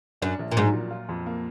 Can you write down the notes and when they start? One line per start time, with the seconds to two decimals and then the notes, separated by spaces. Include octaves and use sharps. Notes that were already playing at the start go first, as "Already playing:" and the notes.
0.22 F#2 D4
0.39 A#1
0.52 A#2
0.57 G#2 F#3
0.74 A#2
0.91 F4
1.09 F2
1.26 A#3